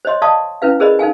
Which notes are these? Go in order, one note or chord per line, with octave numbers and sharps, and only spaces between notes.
C5 C#5 D#5 C6
D5 D#5 F5 A5 C#6 D#6
C#4 E4 B4 F5
G#4 A#4 C5 D5 D#5 B5
D#4 A4 F5 G#5